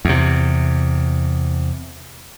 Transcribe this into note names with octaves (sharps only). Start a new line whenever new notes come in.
E2 C3